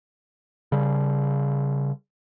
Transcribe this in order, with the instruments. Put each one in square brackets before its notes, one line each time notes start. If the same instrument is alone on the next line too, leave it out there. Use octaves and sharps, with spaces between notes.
[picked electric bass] C#3 G3